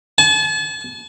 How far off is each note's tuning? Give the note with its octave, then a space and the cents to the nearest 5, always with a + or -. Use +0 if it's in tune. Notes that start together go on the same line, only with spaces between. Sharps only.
A5 -40